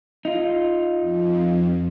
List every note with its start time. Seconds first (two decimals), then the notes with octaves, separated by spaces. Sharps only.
0.25 D#4 F4
1.00 F2